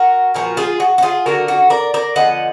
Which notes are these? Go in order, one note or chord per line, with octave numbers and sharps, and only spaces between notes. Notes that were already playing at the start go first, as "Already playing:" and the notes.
Already playing: F#4 A#4
A#2 F3 B3 F#4 A#4
F4 G#4
F#4
F#4
F4 G#4
D3 F#3 D4 F#4 A#4
F#4
A#4 D5
A#4 D5
D3 F3 B3 D#5 F#5